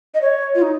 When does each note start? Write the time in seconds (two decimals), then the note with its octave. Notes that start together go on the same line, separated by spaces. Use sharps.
0.14 D#5
0.21 C#5
0.55 F4
0.62 D#4